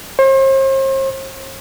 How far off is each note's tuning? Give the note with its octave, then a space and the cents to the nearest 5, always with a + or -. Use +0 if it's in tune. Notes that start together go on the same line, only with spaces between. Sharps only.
C5 +40